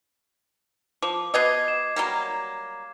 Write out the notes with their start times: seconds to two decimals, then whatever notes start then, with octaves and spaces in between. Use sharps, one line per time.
1.02 F3 D6
1.34 B2 B3 D#5 D6 G#6 C7
1.68 E7
1.96 F#3 G3 A#3